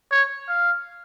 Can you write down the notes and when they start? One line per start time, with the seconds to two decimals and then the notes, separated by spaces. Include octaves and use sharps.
0.11 C#5
0.48 F5